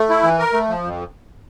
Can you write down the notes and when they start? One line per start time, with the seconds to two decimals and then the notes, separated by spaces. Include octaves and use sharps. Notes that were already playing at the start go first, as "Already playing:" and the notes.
Already playing: A3
0.09 E4
0.23 E3
0.39 A#4
0.53 A3
0.69 F3
0.83 F2